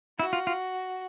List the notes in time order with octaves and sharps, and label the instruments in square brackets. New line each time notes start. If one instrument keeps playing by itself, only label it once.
[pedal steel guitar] E4 [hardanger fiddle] F#4
[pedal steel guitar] F4
F4